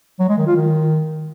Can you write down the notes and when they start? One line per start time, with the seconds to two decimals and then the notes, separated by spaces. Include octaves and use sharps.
0.19 F#3
0.29 G#3
0.38 D#3
0.47 F4
0.56 D#3